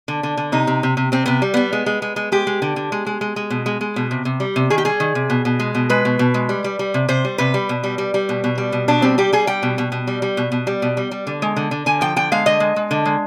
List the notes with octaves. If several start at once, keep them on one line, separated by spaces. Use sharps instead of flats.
D3
D3
D3
C3 D#4
C3
C3
C3
C3 C4
C3 B3
G3
G3 B3
G#3
G#3
G#3
G#3
G#3 G4
G#3
D3
D3
G#3
G#3
G#3
G#3
B2
G#3
G#3
B2
C3
C3
G3
C3
D#3 G#4
G4
G3 G#4
D#3
C3
B2
B2
G#3
B2
G#3 B4
B2
B2
G#3
G3
G3
G3
C3
C3 C5
G3
C3 B4
G3
B2
G3
G3
G3
B2
B2
G3
B2
B2 D4
G3 C4
G3 G4
G3 G#4
G3 G5
B2
B2
B2
G3
G3
B2
B2
G3
B2
G3
G3
D3
G#3
D3
D3
D3 G#5
F3 G5
D3 G5
G#3 F5
D3 D#5
G#3
G#3
D3
G#3